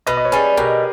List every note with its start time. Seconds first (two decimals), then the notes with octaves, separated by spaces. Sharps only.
0.07 B2 B4 D#5
0.17 D#5
0.25 C#5
0.32 G3 C#4 G#4 B4
0.57 B2 G4 A#4